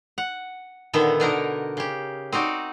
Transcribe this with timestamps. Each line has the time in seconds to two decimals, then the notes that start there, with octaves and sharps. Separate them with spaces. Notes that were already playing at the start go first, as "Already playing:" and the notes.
0.18 F#5
0.93 A#2 D3 D#3 B3 A4 E5
1.20 B2 D3 D4 D#4 A#4
1.77 C#3 G4
2.32 C4 D#4 F#4 D5